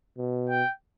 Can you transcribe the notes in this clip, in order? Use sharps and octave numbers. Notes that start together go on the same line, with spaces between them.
B2
G5